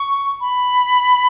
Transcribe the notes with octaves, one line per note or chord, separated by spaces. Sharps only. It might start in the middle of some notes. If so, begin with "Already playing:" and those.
Already playing: C#6
B5